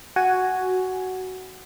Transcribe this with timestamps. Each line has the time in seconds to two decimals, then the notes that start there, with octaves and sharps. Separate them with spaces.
0.16 F#4 G#5